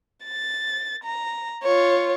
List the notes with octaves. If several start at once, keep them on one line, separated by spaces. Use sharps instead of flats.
A6
A#5
F4 C#5